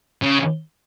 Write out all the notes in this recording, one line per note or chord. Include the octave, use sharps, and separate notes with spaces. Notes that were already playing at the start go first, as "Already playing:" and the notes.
C#3